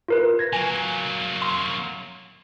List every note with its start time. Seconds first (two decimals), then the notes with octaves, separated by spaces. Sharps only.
0.08 F4 A#4 B4
0.39 G#6 A#6
0.53 F#3 A#3 G#5
1.42 C6